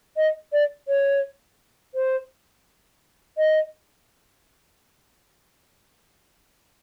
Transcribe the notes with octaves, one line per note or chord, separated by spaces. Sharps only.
D#5
D5
C#5
C5
D#5